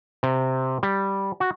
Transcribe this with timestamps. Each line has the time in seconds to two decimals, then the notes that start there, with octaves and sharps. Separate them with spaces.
0.23 C3
0.83 G3
1.40 F#4